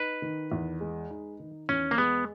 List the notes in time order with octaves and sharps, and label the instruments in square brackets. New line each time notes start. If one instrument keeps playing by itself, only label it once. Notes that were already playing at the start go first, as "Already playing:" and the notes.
Already playing: [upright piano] D#4 [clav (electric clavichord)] B4
[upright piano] D#3
E2
G#3
D#4
D#3
[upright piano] E2 [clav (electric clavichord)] C#4
[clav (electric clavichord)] A#3
[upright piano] G#3 [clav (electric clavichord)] B3